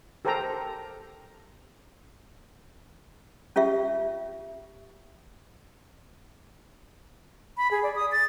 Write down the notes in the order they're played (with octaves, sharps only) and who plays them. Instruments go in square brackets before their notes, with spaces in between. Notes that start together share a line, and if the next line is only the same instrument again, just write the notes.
[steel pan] G4 A4 A#4 C5 G5 A#5
[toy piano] C#4 F4 G4 E5
[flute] B5
G#4
D5
D#6
A6